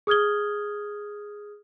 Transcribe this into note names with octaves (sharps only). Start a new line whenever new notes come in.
G#4 D#6 F6 G#6 G7